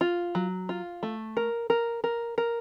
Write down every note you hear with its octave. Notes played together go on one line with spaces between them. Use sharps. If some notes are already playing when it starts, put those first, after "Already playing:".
F4
F#3
F4
A3
A#4
A#4
A#4
A#4